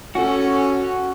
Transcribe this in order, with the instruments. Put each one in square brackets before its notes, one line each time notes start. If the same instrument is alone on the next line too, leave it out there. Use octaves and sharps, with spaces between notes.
[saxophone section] C#4 A4 [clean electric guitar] F#4